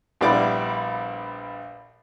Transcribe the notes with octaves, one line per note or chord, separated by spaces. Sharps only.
A#1 G3 B3 E4 D5 D6